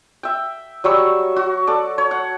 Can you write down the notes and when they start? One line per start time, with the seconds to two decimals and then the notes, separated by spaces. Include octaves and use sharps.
0.23 E5 G5
0.84 F#3 G3 C#6 E6
1.36 F#4
1.67 A4 D5
1.98 C#5
2.11 F#5